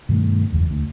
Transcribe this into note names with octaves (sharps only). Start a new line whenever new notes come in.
G2 B2 D#3 A3
F#1 E2 G#3
D2